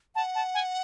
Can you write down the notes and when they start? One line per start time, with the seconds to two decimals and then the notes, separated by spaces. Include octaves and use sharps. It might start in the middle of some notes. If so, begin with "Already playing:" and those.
0.15 F#5 A5
0.35 A5
0.54 G#5